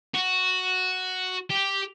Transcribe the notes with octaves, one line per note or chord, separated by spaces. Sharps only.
F#4
G4